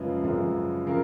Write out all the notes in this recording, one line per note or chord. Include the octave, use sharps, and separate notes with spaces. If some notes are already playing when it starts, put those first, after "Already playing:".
Already playing: F#2 C#3 F3 G#3 B4
F#2 C#3 F3 G#3
C#3 F3 A#4